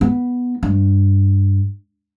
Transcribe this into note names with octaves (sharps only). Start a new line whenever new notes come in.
B3
G2